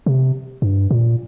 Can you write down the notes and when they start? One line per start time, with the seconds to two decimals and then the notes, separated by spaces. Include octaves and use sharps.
0.06 C3
0.62 G2
0.91 A#2